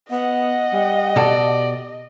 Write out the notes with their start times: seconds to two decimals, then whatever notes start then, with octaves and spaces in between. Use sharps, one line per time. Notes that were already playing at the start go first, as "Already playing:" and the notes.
0.11 B3 D#5 F#5
0.73 G3
1.16 B2 G4 A4 D5